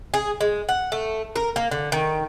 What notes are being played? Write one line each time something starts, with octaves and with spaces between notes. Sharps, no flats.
G#4
G#3
F#5
A3
A#4
A#3
D3
D#3